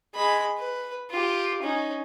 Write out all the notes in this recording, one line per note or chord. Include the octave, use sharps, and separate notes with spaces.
G#3 B5
B4
F4 G4
C#4 D#4